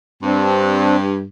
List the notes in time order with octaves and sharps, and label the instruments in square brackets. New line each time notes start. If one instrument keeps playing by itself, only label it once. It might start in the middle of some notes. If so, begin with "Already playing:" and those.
[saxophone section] G2 [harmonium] C4 D4